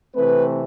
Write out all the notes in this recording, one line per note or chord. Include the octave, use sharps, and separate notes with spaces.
C3 E3 A3 C4 B4